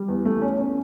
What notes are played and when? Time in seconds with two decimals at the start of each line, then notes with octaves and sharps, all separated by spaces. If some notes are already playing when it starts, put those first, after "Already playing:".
Already playing: G3
0.08 E2
0.25 A3
0.42 C#4
0.58 C#4